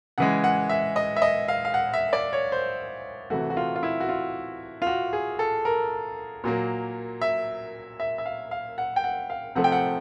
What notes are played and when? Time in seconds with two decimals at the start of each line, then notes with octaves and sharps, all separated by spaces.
0.18 C#3 E3 G#3 F#5
0.44 F#5
0.69 E5
0.96 D#5
1.16 E5
1.22 D#5
1.48 F5
1.65 F5
1.74 F#5
1.94 E5
2.13 D5
2.33 C#5
2.52 C5
3.30 C3 E3 A3 F#4
3.50 F#4
3.57 F4
3.76 F4
3.83 E4
4.00 F#4
4.09 F4
4.82 F4
4.87 F#4
5.13 G#4
5.39 A4
5.65 A#4
6.44 A#2 F#3 A#3
7.22 E5
8.00 E5
8.18 E5
8.26 F5
8.51 F5
8.78 F#5
8.96 G5
9.04 F#5
9.30 F5
9.55 C3 F3 A3 F#5
9.64 G5
9.72 F#5